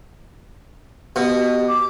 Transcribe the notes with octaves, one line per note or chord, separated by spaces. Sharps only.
B2 G4
D6